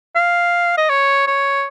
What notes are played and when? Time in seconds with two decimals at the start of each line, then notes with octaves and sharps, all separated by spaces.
0.15 F5
0.77 D#5
0.89 C#5
1.27 C#5